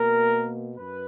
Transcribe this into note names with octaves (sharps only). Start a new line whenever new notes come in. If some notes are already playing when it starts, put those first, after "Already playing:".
Already playing: B2 A#3 A#4
F#2 B4